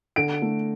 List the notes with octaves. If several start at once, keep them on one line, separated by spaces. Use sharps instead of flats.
D3 D7
A3